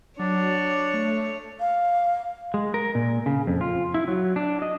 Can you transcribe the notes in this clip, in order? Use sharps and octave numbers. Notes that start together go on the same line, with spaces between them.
F#3 D4 C#5
A3
F5
G#3
A#4
A#2
C#3
F2
F4
E4
F#3
D4
D#5